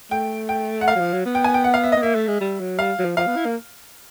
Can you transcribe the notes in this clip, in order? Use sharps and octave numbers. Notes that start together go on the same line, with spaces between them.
A3 G5
G5
F#5
F5
F#3
F3
F#3
B3
G5
G#5
G5
F#5
F5
E5
D#5
B3
A#3 E5
A3
G#3
G3
F#3
G3 F5
F#3
F3
F3 F5
B3
E4
A#3